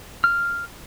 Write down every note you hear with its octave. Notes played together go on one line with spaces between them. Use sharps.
F6